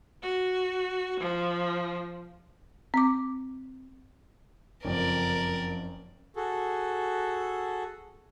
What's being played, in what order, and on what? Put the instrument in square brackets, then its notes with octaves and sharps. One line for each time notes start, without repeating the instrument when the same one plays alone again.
[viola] F#4
F3
[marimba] C4 D6
[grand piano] F#1 F2 [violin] A#4 D5
[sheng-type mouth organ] F#4 G#4 A4